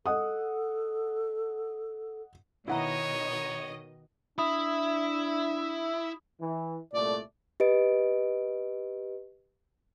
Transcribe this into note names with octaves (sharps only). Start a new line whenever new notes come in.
A4 D#5 F#5 D#6
B2 D#3 E4 C#5 D#5 F#5 A#5
D4 E4 E5 B5 D#6
E3
C2 A#2 A3 D5
G4 B4 D#5 D7